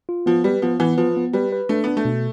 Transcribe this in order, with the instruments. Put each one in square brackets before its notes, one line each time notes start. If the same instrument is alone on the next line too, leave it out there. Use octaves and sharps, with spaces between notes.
[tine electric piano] F4
[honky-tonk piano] F3 [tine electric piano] B3
[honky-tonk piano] G3 [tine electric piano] B4
[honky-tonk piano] F3 [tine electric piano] B3
[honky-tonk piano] E3 [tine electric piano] B3
[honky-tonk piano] F3 [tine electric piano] B4
[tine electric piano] B3
[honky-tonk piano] G3 [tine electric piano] B4
[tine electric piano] B4
[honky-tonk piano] A3 [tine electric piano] D4
[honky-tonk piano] B3 [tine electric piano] D4
[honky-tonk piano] A3
[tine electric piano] B2